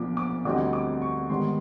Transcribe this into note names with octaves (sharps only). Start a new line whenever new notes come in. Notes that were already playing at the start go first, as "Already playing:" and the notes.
Already playing: B1 A#2 F3 A#3 D4 D6
D6
D2 D3 G3 C4 D#4 D6
D6
C#6
G#2 D#3 G3 B3 C6